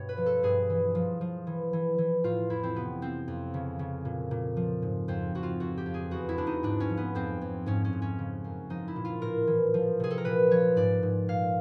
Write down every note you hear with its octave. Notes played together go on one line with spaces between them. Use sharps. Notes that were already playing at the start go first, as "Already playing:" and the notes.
Already playing: G2 B2 C#5
B4
F3
A4
G2 G#4
E3
F3
F3
E3
E3
E3
A2 F4
F2 E4
C4
C3 B3
F3 C4
F2
C#3
C#3
A#2
A#2
F3
G#2
F2 C4
F2 F#4
F4
F2 F#4
G4
F2
G#4
E2 F#4
E4
E2 D4
D#4
G#2 D4
C#4
F3
B3
F2 C4
F2
G#2 C#4
C#4
G#2
C#4
C#3
F#2
F3 D#4
E4
A#2
F4
A2 A#4
E3
F3
C3 G#4
A4
A#4
A#2 B4
F3 C#5
G#2 D5
G#2
A#2 F5